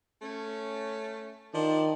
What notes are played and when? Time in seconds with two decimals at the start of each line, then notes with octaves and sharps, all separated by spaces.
0.22 A3 C#4
1.54 D#3 F3 D4